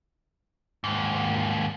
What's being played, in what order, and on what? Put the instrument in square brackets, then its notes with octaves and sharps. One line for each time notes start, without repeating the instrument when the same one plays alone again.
[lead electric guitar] D#2 G#2